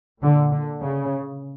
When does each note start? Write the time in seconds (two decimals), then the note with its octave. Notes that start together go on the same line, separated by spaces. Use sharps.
0.22 A#2 D3
0.52 D3
0.82 C#3